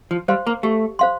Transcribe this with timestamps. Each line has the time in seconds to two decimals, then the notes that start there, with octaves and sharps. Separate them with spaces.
0.11 F3
0.28 G3 C5 F5 C6
0.47 A#3
0.63 A3 G4
0.99 C5 F5 C6